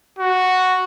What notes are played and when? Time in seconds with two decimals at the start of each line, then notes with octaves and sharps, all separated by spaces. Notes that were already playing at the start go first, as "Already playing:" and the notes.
0.19 F#4